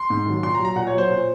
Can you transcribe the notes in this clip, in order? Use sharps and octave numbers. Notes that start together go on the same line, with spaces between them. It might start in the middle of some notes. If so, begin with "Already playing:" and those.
Already playing: C6
G#2
D#3 F#3
A#2 C6
A#5
F#3
A#5
A#2 F#5
C#5
F#3 C5
A#2